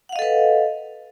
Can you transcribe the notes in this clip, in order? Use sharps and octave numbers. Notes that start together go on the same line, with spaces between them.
A4 B4 D#5 F5 F#5